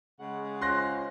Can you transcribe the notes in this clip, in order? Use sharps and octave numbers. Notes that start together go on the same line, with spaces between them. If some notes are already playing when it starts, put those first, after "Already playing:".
C#3 G#3 F#5
C#4 F4 C5 C6 F#6 A#6